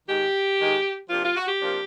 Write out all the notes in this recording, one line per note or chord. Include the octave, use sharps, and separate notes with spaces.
G#2 D#3 G#3 G4
G#2 D#3 G#3
C3 F3 A#3 D4 F4
F4
F#4
G4
C3 F3 A#3 D4